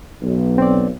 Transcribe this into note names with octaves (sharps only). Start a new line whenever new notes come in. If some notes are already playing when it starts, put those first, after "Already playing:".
B1
C4 D5